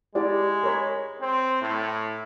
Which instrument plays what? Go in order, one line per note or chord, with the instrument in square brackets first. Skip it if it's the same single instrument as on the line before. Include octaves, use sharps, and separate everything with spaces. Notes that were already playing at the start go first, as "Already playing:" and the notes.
[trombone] G#3 [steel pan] E4 G4 D5
[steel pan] A#4 C#5 B5
[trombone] C4
A2